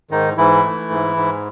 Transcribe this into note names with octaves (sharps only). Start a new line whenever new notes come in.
G#2 D#3 D#4
G#2 E3 E4
A3
G#2
G#2